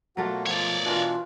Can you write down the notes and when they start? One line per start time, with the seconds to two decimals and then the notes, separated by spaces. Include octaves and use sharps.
0.17 B2 F#3 A3 A#3 F4 F#4 F#5
0.46 F3 C#5 D5
0.85 B2 E3 D4 F4 A#4 F#5